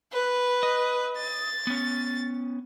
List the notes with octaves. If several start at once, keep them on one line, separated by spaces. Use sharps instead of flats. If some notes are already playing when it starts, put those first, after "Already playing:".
B4
D#5
A6
B3 C#4